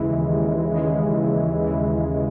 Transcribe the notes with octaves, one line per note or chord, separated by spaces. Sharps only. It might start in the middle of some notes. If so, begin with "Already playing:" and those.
Already playing: D#2 C#3 E3 G#3
D#2
C#3 G#3
D#2
E3